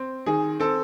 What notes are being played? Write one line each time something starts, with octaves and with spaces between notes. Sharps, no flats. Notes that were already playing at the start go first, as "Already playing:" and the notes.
Already playing: C4
D#3 G#4
C4 A4